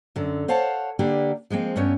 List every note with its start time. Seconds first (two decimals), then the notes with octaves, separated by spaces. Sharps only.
0.16 F#2 D3
0.48 C5 C#5 F5 F#5 A5
0.99 D3 A#3 D4 G4 B4
1.50 F3 G#3 A#3 C4
1.76 G2 A3 B3 C#4 C#5